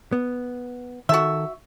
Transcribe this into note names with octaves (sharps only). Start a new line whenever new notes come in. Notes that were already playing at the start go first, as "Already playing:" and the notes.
B3
D#3 F#4 A4 E5